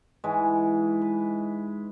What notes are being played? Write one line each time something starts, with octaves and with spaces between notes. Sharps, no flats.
G#2 E3 G#3 B4
B4